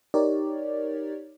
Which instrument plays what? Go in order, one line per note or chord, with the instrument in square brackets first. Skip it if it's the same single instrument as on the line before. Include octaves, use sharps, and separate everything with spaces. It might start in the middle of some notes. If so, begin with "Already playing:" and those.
[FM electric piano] D#4 G4 A#4 C#5 D5